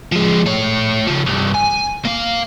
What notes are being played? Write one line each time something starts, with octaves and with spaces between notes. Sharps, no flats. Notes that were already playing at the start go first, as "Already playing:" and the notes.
F3 G#3
A3 C#5
C#3 F3
C2 G2
G#5
A#3 F5